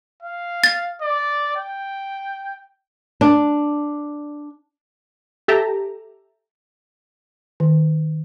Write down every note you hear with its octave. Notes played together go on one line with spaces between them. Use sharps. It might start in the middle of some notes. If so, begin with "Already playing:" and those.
F5
A6
D5
G5
D4
G4 A4 E5 G5 A5 A#5
D#3